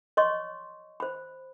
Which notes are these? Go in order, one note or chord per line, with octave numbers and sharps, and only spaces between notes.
C#5 D#5 C6 C#6
C5 B5